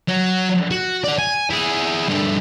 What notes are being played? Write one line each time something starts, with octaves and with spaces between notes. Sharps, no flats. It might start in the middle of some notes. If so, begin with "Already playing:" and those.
F#3
F#4
D5 F#5
G#5
E4 G#4
G2 A3